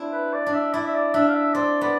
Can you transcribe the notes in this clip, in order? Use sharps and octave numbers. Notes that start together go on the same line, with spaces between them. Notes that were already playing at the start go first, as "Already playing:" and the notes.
Already playing: C4 D4 E4
B4
D5
D4
E5
E4 D5
E5
D5
D4 E5
F5
E5
C4 D5
B3 D5